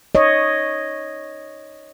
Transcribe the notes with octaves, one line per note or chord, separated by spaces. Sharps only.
C#5 D#5